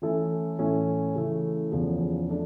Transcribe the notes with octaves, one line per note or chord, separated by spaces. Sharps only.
E3 A3 C#4 E4 A4
A2 E3 A3 C#4 E4
C#3 E3 A3
E2 C#3 F3
F3 A3 D4